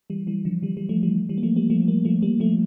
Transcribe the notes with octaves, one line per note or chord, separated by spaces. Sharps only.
E3 G3
E3 G3
D3 F3
E3 G3
E3 G3
F3 A3
E3 G3
E3 G3
A#3
F3 A3
G3 A#3
F3 A3
G3 A#3
F3 A3
G3 A#3
F3 A3